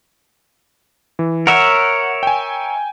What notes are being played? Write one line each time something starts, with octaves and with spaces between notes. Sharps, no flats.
E3
A#4 C#5 E5 F#5
G5 G#5